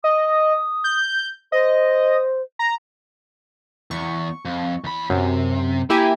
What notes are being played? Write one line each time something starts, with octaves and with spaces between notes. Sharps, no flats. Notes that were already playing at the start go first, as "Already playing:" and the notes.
D#5 D#6
G6
C5 D#5
A#5
E2 C#6
F2
E2 B5
C#2 F#2 C3
A#3 E4 G4 G#5